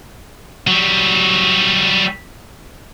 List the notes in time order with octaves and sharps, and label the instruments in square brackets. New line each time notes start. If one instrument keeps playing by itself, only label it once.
[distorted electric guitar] F#3 G3